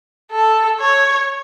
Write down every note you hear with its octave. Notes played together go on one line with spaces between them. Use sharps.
A4
C#5